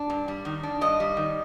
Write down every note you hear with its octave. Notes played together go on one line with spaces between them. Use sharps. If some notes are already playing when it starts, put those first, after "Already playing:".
Already playing: D4
G2
G3
D#3
D4
G2 D#5
G3
D#3